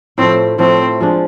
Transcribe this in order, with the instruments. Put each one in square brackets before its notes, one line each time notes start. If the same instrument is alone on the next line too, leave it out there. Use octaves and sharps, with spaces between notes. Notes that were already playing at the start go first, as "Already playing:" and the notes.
[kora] A2 F3 A3 [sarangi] C4
[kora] A2 F3 A3 [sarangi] C4
[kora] F3 G#3 D4